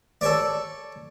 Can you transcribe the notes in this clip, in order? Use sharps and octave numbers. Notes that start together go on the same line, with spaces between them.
A4 C#5 D5